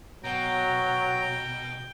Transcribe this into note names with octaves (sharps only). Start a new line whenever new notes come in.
B2 F#3 G5 A#5